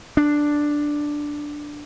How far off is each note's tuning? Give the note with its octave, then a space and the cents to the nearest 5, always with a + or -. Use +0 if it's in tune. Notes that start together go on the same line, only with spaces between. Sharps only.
D4 +5